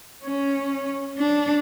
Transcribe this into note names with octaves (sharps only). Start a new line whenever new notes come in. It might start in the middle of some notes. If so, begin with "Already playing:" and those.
C#4
D4